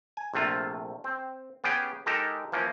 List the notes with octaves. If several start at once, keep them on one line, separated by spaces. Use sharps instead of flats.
G#5
A#1 C3 A3 F4
C4
B3 C#4 G4 G#4 G5
G#3 D#4 G4 A4 A#4
E3 F3 A#3 C#4